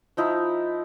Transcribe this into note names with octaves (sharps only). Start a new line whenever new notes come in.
F3 D#4 E4